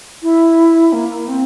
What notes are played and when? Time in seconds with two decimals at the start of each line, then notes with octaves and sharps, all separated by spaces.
0.23 E4
0.93 A#3
1.28 C4